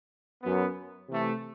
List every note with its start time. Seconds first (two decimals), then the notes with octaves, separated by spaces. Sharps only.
0.43 F#2 F#3 B3
1.09 C3 E3 A3